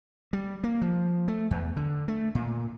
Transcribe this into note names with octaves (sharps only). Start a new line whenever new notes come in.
G3
A#3
F3
A3
E2
D3
A3
A#2